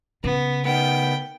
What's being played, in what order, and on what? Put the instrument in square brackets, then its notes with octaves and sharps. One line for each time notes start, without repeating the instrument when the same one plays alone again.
[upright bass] C#3 [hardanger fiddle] B3
[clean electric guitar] D#3 B3 [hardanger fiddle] G5